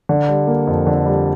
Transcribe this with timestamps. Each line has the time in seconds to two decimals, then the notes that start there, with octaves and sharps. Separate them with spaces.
0.09 D3
0.29 G3
0.47 A#3
0.67 F2
0.87 D3
1.06 G3